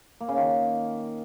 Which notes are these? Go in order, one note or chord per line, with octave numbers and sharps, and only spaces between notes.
A#3
C#3
D#3